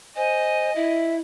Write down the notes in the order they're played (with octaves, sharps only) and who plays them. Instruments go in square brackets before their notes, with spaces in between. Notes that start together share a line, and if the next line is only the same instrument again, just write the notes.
[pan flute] C5 [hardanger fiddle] D#5 [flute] G#5
[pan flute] E4 [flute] E5